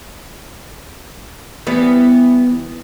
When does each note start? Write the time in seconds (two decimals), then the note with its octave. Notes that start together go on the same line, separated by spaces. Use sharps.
1.67 E3 G3 B3